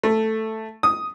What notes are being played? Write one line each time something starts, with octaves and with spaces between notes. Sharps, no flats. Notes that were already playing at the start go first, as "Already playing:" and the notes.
A3
D#6